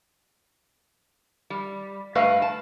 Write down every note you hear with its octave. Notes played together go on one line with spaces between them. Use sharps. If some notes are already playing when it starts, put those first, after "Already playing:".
G3
G2 A3 B4 D#5 F5
A5